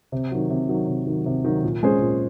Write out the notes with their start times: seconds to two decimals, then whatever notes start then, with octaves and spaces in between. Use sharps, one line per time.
0.12 C3
0.31 D#3 F#3
0.50 C3
0.69 D#3 F#3
0.88 C3
1.07 D#3 F#3
1.26 C3
1.44 D#3 F#3
1.64 A#2
1.83 G#3 C#4 G#4 C5
2.02 A#2